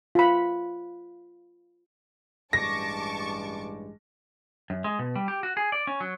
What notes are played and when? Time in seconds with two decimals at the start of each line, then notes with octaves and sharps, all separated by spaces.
0.15 F4 B5
2.53 A1 G2 G#3 A5 C#6 D6 A#6
4.70 F#2
4.84 G#3
4.99 B2
5.15 G3
5.28 G4
5.43 F#4
5.57 G#4
5.72 D5
5.87 C#4
6.00 F#3